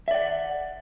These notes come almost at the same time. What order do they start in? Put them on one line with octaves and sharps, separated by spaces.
E5 D5 F#5